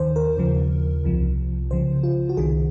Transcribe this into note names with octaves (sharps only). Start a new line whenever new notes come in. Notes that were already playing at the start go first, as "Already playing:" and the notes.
Already playing: D#2 D#3 C5
A#4
D#2 C#3 F3
C2 C3 F3
C#2 C#3 F3 C5
F4
F#4
C2 C3 D#3 G#4